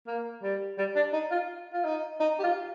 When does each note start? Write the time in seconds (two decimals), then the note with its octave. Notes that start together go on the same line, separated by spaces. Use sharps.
0.07 A#3
0.43 G3
0.78 G3
0.96 D4
1.13 D#4
1.31 F4
1.73 F4
1.85 D#4
2.20 D#4
2.39 G4
2.43 F4